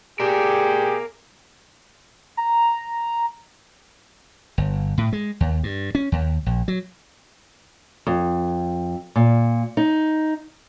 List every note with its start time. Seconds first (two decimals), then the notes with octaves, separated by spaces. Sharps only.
0.20 G4 G#4 A#4 D5
2.37 A#5
4.58 G1
4.98 A2
5.12 G#3
5.41 D#2
5.63 G2
5.95 C#4
6.12 D#2
6.46 A#1
6.68 F#3
8.07 F2
9.16 A#2
9.77 D#4